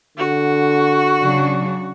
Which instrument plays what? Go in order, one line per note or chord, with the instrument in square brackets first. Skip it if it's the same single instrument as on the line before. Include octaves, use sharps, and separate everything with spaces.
[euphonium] D3 [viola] F#4
[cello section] C#3 F#3 D4